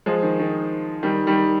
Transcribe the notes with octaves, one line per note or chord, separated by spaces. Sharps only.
F3 G#3
D#3
D#3
D#3 G3
D#3 G3